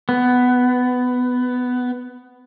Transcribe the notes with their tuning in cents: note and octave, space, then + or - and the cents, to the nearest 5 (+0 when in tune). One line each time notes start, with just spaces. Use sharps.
B3 +15